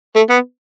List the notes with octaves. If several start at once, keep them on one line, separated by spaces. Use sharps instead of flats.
A3
B3